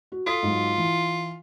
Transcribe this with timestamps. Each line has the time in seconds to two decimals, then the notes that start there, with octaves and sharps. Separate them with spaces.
0.12 F#4
0.27 F4 A4 D#6 B6
0.43 G#2 F#3
0.78 E3